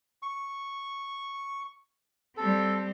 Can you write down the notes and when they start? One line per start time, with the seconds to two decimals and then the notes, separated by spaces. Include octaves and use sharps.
0.22 C#6
2.37 G3 C4 A4